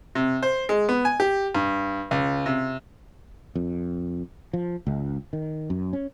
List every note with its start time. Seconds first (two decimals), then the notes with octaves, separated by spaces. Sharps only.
0.15 C3
0.43 C5
0.69 G#3
0.89 B3
1.05 G#5
1.20 G4
1.55 G2
2.11 C#2
2.46 C3
3.56 F2
4.53 F3
4.87 C#2
5.33 D#3
5.70 F#2
5.93 C#4